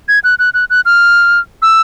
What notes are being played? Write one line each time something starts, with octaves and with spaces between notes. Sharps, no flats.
G#6
F#6
F#6
F#6
F#6
F6
E6